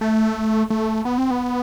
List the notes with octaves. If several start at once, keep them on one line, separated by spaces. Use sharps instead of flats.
A3
A3
B3
C4
B3